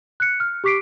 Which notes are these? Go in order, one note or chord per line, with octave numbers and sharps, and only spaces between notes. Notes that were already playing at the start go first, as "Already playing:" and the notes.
F#6 C#7
F6
G4 C#6 D6 B6 C7 D7